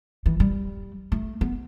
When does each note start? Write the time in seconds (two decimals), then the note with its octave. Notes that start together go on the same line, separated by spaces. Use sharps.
0.26 E3
0.40 G3
1.12 A3
1.41 B3